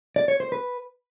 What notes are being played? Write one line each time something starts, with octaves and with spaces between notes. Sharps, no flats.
D5
C#5
C5
B4